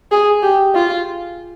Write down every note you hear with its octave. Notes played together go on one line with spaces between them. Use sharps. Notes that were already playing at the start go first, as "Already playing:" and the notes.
G#4
G4
F4